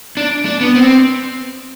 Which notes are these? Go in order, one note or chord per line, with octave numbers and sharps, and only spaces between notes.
D4
D4
B3
C4